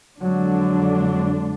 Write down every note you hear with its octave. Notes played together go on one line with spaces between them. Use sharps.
F2 D3 F#3 G#3 D4